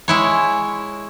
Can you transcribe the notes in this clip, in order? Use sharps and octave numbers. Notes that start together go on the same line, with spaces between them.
G#3 E4 C#5